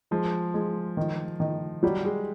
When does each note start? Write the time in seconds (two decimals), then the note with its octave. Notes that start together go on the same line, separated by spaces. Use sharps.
0.11 F3 G#3
0.54 G#3
0.97 D#3
1.40 D#3
1.83 F#3 G3
2.05 G#3